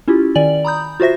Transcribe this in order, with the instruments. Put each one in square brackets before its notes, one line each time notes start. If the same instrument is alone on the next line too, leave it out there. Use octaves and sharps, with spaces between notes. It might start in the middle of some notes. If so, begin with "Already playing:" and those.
[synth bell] C#4 E4 F4 G4
D#3 D5 G#5 F#7
A#5 B5 D#6 G6
F4 F#4 C5 E5 A#6